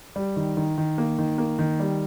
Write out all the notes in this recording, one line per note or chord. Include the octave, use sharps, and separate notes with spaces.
G3
D#3
D#3
D#3
A#3
D#3
A#3
D#3
G3